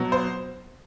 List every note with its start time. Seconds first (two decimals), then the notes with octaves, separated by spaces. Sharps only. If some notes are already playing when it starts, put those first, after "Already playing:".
Already playing: B2 F#3
0.12 C5